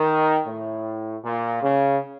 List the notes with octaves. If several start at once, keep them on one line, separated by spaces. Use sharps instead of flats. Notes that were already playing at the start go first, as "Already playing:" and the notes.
Already playing: D#3
A2
A#2
C#3